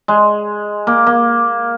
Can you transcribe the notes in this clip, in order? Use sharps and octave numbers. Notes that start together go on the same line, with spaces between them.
G#3
A#3
A#3